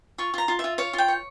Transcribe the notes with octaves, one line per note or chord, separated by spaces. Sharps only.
F4 C#6
F4 A#5
F4
F4 E5
C#5 F5
F4 G5
C#5